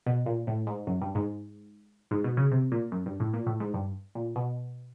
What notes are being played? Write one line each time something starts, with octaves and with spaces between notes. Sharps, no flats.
B2
A#2
A2
G#2
F#2
G2
G#2
G#2
B2
C#3
C3
A#2
F#2
G2
A2
A#2
A2
G#2
G2
A#2
B2